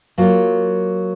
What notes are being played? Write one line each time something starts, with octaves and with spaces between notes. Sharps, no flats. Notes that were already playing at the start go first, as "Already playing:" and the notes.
F#3 A#3 F4